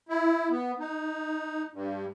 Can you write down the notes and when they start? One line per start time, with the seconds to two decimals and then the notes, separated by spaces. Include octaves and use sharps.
0.09 E4
0.51 B3
0.79 D#4
1.73 G2